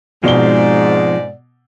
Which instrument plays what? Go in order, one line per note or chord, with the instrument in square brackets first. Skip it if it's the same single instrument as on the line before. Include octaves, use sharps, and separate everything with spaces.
[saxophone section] G#2 D5 [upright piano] B2 G7 [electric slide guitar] F3 G#3 C4